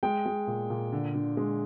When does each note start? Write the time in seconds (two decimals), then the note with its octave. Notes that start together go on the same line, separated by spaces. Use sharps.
0.03 G#3 G5
0.26 G#3
0.47 A#2
0.70 A#2
0.92 D3
1.14 D3
1.37 G#3